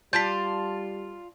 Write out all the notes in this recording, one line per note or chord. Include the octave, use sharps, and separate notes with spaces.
G3 F4 D5 A5 C6 G6 B6